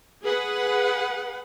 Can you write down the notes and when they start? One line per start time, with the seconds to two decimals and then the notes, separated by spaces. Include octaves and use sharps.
0.24 G#4 B4 F#5